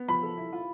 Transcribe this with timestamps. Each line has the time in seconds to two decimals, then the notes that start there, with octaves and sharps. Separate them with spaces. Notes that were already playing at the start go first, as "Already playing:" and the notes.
Already playing: B3
0.08 F3 B5
0.23 A4
0.37 E4
0.53 F4